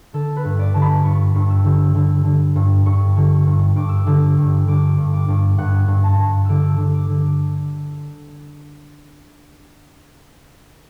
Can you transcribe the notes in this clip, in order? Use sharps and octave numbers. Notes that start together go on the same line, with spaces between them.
D3 A4
B4
G2
D5
D3 A5
B5
G2 C#6
G2
E6
D3
D3
D3
G2
G2 C#6
D3
G2
G2 D6
E6
D6
D3
G2
D3 D6
G2
D6
G2
G2 F#5
G2
A5
G2
D3 D6 E6
D3
D6
D3